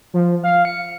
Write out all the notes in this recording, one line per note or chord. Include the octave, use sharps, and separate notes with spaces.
F3
F5
C#7